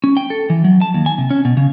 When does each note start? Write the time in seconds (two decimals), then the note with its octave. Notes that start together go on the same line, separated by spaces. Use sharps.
0.04 C#4
0.17 G5
0.30 A4
0.50 E3
0.64 F#3
0.81 A5
0.94 D#2
1.06 G#5
1.18 C3
1.31 C#4
1.45 B2
1.57 C#3